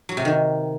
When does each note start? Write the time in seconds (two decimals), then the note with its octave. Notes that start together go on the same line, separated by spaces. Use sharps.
0.09 F#3
0.17 C3
0.25 D#3